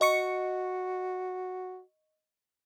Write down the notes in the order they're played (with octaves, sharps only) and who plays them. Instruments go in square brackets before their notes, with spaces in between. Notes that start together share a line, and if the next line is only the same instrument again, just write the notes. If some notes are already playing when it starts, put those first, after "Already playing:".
[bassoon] F#4 [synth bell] D#5 C#6 C#7